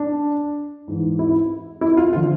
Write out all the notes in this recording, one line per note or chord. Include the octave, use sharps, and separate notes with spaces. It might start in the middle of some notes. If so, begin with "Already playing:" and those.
Already playing: D4
G#2 E3
E4
E4
F4
D3 F3 F4